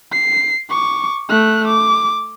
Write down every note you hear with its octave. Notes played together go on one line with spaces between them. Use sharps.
C7
C#6 D6
A3 F#6
D6